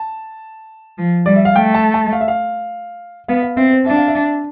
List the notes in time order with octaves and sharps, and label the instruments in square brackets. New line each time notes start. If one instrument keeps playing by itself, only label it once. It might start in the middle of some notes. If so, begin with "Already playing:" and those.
Already playing: [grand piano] A5
[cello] F3
[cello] G3 [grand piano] D5
[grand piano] E5
F5
[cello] A3 [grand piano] G5
[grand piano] A5
A5
F5
E5
F5
[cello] B3 [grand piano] F5
[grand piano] F5
[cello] C4 [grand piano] E5
[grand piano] C5
[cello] D4 [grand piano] E5
[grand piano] F5
E5